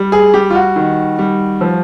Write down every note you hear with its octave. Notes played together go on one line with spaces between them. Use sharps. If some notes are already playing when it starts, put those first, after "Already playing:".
Already playing: G3
G#4
G3 G4
F4
F#4
D#3
G3
F3